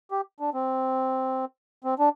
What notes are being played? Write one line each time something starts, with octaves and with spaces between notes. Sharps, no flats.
G4
D4
C4
C4
D4